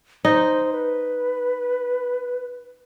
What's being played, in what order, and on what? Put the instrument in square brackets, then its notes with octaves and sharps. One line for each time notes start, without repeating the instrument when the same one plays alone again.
[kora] D#4 [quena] C5
[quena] B4